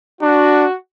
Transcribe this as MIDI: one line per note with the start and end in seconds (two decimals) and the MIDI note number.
0.22 0.65 62
0.22 0.74 66